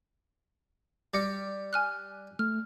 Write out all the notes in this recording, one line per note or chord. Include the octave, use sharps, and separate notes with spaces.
G3 D6 A#6 C#7
G#5 F6 F#6
A3 F6